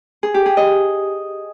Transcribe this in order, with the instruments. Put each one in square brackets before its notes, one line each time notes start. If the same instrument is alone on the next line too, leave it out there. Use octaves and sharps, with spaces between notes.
[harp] G#4
G4
G#4
D#5